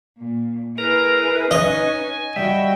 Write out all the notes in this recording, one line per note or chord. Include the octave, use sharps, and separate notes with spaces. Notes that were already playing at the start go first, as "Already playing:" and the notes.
A#2
E4 G#4 A#4 B4 A#5
C#4 D#4 D#5 G#5
G3 F#4 D#5 E5 G5